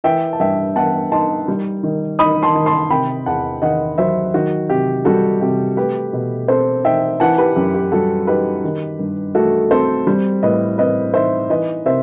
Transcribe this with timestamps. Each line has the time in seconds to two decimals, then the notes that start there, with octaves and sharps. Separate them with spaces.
0.04 E3 E5 G5
0.33 A5
0.40 G2 E5 G5
0.76 B3 F#5 A5
1.11 D#4 A5 C6
1.48 G3
1.83 D#3
2.19 D#4 B5 D#6
2.43 A5 C6
2.55 D#3
2.66 A5 C6
2.90 C3 G5 B5
3.26 E2 F#5 A5
3.62 D#3 D#5 F#5
3.98 F#3 C5 E5
4.34 D#3 F#4
4.69 C3 G4
5.05 G3 F#4 A4
5.41 C3 G4
5.77 A3 G4 B4
6.13 B2
6.48 C4 A4 C5
6.84 D#4 E5 G5
7.20 E3 F#5 A5
7.38 G4 B4
7.56 F#2 G4
7.74 G4
7.92 G3 F#4 A4
8.27 D#4 G4 B4
8.64 D#3
8.99 G2
9.35 A3 F#4 A4
9.71 C4 A4 C5
10.07 G3
10.43 A2 B4 D#5
10.78 C4 B4 D#5
11.14 D#4 C5 E5
11.50 E3 B4 D#5
11.85 C3 C5 E5